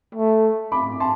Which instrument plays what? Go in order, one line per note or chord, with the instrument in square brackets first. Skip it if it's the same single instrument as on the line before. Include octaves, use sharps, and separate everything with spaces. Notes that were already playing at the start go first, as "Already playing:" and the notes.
[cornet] A3
[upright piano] B5 D6
A5 C6